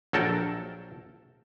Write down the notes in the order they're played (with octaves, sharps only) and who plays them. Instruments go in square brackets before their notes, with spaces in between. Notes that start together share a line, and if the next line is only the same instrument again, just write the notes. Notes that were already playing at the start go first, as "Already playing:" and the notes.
[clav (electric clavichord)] A#1 F#3 A4 A#4 G5 A5